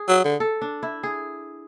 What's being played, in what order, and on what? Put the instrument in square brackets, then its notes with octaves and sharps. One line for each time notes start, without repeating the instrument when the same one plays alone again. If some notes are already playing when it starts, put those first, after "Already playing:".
Already playing: [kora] G#4
[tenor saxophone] F#3
D3
[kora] A4
D4
E4
G#4